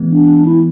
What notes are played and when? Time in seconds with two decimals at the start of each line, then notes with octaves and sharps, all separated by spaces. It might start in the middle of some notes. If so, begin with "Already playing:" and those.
Already playing: E3 G#3 B3
0.10 D4
0.45 E4